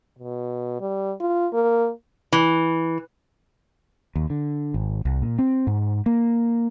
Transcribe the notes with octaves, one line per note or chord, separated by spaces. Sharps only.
B2
G3
F4
A#3
E3
D#2
D3
G#1
C2
A#2
C4
G#2
A#3